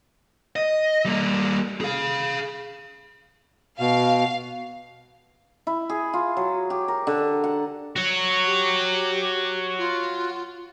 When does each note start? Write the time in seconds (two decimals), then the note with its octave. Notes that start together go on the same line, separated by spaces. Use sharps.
0.56 D#5
1.06 G3 A#3
1.81 G#4 F5
3.80 B2 F5
5.67 E4
5.90 G#4
6.14 F4
6.37 F#3
6.70 G4
6.88 A#4
7.07 D3
7.44 F#5
7.96 F#4 C#5
8.47 G4
9.78 F4